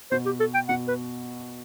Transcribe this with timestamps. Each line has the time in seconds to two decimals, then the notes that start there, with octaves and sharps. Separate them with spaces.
0.11 B2 C5
0.26 G4
0.40 A4
0.54 G5
0.69 B2 F#5
0.88 B4